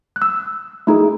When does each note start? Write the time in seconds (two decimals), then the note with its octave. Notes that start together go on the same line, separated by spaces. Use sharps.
0.16 F#6
0.22 E6
0.87 A3 D#4 G#4